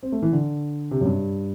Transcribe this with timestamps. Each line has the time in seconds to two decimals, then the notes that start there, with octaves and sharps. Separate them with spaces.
0.03 C4
0.12 A3
0.22 E3
0.32 D3
0.91 C3
1.01 F#2
1.06 G2